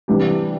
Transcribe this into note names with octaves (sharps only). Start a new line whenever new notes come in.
C3 E3 G3 D4 G4